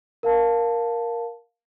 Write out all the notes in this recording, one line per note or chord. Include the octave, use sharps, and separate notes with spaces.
A#4 F5 A5